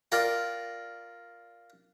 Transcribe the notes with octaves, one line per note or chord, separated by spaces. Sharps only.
F4 A#4 D5 G5